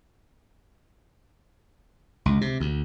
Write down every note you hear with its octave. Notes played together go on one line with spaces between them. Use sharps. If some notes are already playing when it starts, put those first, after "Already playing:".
C#2
C3
D2